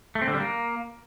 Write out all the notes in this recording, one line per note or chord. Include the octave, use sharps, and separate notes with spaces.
A3
C4
D3
G3
A#3